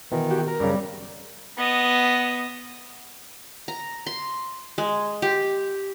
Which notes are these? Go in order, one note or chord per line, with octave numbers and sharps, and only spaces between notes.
B2 D#3 E3
F#4 G4
A#4
F#2 C#3 G3
B3 D#5
A#5
C6
G#3
G4